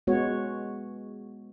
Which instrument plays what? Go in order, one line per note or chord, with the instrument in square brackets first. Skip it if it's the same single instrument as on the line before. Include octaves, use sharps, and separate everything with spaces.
[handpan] G#3 B3 F#4 C#5